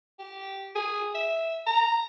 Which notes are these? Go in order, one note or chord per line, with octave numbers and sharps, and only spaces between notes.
G4
G#4
E5
A#5